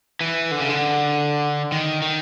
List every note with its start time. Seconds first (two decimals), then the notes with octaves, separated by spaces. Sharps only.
0.21 E3
0.51 D3
0.60 C#3
0.69 D3
1.72 D#3
2.02 D#3